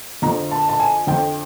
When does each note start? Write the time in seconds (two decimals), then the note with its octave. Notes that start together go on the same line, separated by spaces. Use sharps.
0.22 F2 D3 F3 A#5
0.51 A5
0.69 A5
0.80 G#5
1.07 F2 D3 F3 G5